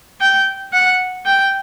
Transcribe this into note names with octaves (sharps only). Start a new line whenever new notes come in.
G5
F#5
G5